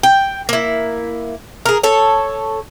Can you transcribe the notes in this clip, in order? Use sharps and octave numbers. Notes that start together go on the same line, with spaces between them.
G5
A#3 E4
G#4 A#4
A4 C#5